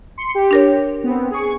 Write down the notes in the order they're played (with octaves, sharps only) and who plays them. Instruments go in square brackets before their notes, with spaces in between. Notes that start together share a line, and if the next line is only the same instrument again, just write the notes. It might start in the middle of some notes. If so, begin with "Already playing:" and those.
[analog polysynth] C6 C#7
G4
[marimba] D4 A#4 C#5
[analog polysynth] B3 C4
G#4 C#6